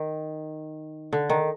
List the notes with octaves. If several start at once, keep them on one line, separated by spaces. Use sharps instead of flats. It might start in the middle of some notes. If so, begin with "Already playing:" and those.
Already playing: D#3
D3
D#3